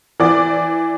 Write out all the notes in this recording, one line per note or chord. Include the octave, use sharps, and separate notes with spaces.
E3 D5